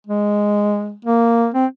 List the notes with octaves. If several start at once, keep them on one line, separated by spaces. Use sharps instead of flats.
G#3
A#3
C4